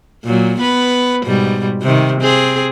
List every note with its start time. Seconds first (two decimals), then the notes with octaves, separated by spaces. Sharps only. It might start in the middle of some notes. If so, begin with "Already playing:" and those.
0.25 A#2 F#3
0.60 B3 B4
1.25 G#2 B2 G3
1.82 C3 D#3
2.21 C4 G#4